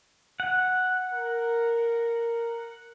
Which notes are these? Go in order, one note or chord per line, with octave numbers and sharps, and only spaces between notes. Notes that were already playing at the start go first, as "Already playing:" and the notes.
F#5
A#4